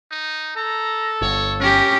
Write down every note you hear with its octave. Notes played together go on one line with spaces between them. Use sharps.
D#4
A4 A#5
G1 C#5
C#4 G4 A#4